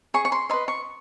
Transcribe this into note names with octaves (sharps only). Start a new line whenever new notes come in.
G#4 C#6
C#6
C6
B4 D#5 C6
C#6